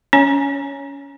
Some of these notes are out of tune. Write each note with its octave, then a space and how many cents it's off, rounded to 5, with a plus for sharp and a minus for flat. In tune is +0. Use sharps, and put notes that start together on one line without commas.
C#4 +20 C#5 +0 G#5 +5